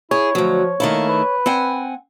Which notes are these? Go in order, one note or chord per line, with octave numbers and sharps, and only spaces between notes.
E4 G#4 C#5
D2 F3 F#3
D#3 A3 A#3 E4
B4
C4 F#5 G#5